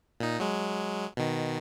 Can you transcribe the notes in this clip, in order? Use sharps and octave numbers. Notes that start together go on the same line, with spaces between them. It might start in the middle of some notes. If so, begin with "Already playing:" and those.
A#2 D#4
F#3 G#3
B2 D#3